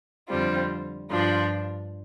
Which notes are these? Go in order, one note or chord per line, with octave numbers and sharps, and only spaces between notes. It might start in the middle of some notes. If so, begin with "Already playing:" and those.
F2 D3 G3 C4 F4
G2 F3 D4 F4